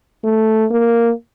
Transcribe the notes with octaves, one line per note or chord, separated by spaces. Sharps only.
A3
A#3